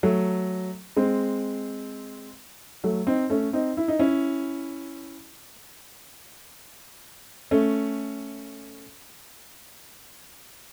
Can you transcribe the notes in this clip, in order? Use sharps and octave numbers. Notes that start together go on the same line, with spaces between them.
F#3 A3
G#3 C4
F#3 A3
C4 D#4
A3 C#4
C4 D#4
E4
D#4
C#4 E4
A3 C#4